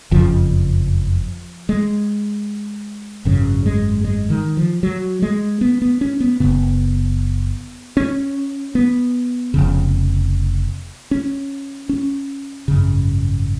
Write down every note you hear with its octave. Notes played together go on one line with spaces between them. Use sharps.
F#1 F2 C#3 F3
G#3
G#1 F#2 C#3
G#3
G#3
D#3
F3
F#3
G#3
B3
B3
C#4
B3
F#1 F2 C#3 B3
C#4
B3
F1 F2 C#3
C#4
C#4
G#1 F#2 C#3